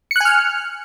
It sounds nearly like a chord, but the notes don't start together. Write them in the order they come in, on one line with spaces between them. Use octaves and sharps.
C#7 F#6 G#5 F6